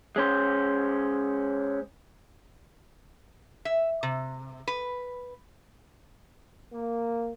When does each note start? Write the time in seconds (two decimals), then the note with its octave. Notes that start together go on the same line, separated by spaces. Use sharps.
0.16 G#3 C#4 C5
3.65 E5
4.03 C3
4.68 B4
6.73 A#3